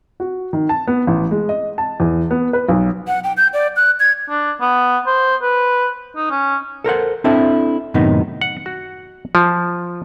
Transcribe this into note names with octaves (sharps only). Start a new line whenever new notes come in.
F#4
D#3
A5
B3
A1
G#3
D#5
A5
E2
B3
B4
B1
F#5
G5
G6
D5
F#6
G#6
D4
B3
C5
B4
D#4
C#4
A4 A#4 C5 F#5
C4 D4 E4 A4 E5
F#2 A2 C3 D#3 B3 D#4
F#5
F#4
F3